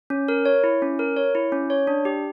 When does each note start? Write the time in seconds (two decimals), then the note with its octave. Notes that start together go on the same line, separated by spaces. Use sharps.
0.10 C#4
0.28 A#4
0.45 C#5
0.64 E4
0.82 C#4
0.99 A#4
1.17 C#5
1.35 E4
1.52 C#4
1.70 C#5
1.87 D4
2.05 G4